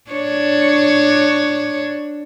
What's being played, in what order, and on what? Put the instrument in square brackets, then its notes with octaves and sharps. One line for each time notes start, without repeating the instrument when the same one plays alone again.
[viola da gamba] D4 C#5